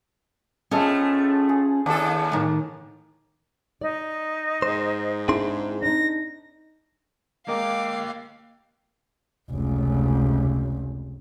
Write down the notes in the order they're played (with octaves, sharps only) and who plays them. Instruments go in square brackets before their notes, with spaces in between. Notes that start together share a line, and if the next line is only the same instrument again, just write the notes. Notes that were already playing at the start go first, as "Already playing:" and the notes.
[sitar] A2 A3 [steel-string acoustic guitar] C#4 F4 D#5 [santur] G#4 A4 C5
[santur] G#4
[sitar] D#2 A4 [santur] D4 D#6
[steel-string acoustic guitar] A2 D#3
[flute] D#4 [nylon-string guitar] D5
[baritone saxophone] G#2 [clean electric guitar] C5
[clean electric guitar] C4 G#4 C6 [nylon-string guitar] D4 E4
[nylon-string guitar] D4 D#4 [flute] A#6
[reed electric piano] G#3 A#4 D#5 [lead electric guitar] A#3 G5 [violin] F5 [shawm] D6
[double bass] F1 C#2